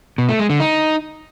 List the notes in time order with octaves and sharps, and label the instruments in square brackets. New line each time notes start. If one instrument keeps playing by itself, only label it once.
[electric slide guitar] B2
A3
G#3
D3
D#4